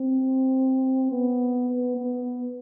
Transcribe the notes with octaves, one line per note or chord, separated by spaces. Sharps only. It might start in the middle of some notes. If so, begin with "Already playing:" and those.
Already playing: C4
B3
B3